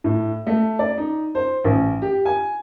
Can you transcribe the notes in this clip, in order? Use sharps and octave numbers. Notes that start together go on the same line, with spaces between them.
A2
A3
D5
D#4
C5
A1
G4
G#5